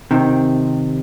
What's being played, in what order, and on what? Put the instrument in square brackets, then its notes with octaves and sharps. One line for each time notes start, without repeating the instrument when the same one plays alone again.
[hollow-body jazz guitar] C3 D#3